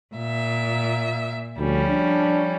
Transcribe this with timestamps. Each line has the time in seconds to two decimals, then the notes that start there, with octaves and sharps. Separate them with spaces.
0.14 A#2 E5
1.57 D2 F3 G3 C#4
1.89 D4